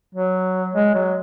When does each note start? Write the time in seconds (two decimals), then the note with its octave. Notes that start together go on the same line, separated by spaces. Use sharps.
0.15 F#3
0.75 G#3
0.95 F#3